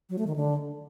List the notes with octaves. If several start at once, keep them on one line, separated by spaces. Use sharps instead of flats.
F#3
A3
D#3
D3